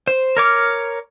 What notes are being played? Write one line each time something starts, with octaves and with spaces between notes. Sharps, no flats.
C5
A#4 C#5 D6 F6